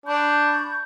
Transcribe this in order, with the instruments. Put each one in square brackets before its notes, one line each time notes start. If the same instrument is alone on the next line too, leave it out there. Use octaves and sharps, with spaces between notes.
[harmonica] D4 [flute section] B5 C#6 G6